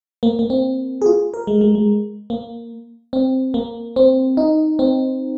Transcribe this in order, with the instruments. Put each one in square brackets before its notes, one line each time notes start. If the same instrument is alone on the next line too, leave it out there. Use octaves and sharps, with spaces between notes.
[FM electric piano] A#3
A#3
C4
G#4
F4
A#4
G#3
G#3
G#3
A#3
C4
A#3
C4
D#4
C4